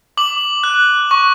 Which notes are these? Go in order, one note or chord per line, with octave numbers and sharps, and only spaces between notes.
D6 F#7
F#6
C#6